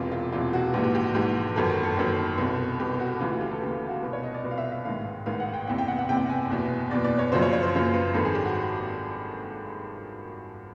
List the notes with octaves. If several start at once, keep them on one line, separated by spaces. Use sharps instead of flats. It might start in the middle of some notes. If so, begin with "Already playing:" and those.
Already playing: E1 E2 C3 E3 F4
F4
E1 E2 C3 E3 F4
F#4
A#1 G#2 E3 F#4
G4
G4
F#4
A#1 G#2 E3 G4
G1 F#2 D#3 A4
A#4
A4
G1 F#2 D#3
C2 B2
C2 B2 G4
F#4
D2 C#3 E3 F4
F#4
G4
A4
D2 C#3 E3 G4
F#4
C2 B2
C#5
D#5
D5
C2 B2
F5
E5
E5
A1 G#2 D#3 F5
A1 G#2 D#3 F5
F#5
G5
F#1 E2 C3 G5
G5
F#5
F#5
F#1 E2 C3 G5
G#5
F#1 E2 B2
F#1 E2 B2 D5
D5
C#5
F#1 F#2 C#3 F3 C5
C#5
C#5
C5
F#1 F#2 C#3 F3
B4
G#1 G2 D#3 A4
G#4
G4
F#4